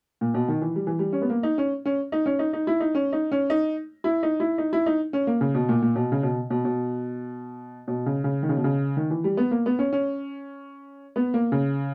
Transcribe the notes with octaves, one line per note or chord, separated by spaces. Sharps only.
A#2
B2
D#3
E3
G3
E3
G3
C#4
B3
A#3
D#4
C#4
C#4
D#4
C#4
D#4
D#4
E4
D#4
C#4
D#4
C#4
D#4
E4
D#4
E4
D#4
E4
D#4
C#4
A#3
C#3
B2
A#2
A#2
B2
C#3
B2
B2
B2
B2
C#3
C#3
D#3
C#3
B2
C#3
D#3
E3
G3
B3
A#3
B3
C#4
C#4
B3
A#3
C#3